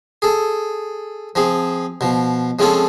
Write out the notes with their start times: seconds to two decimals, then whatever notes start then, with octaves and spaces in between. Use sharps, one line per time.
0.22 G#4 A4
1.35 F3 C4 G#4
2.01 B2 F3
2.59 F3 G#3 C4 C#4 F4 A4